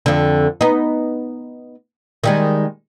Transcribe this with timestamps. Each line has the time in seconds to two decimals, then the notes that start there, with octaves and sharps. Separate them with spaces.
0.06 F2 D3
0.61 B3 D#4
2.24 D#3 G3 G#3